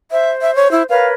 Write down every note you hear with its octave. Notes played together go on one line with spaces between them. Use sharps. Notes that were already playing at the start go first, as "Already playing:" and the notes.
C5 E5
E5
C#5
E4
A#4 B4 C#5 F5